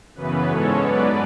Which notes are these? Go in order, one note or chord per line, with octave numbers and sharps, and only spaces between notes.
F#2 C#3 E3 B3 B4
G#2 G#3 C#4 A4 C#5
G#2 F#3 B3 B4 D5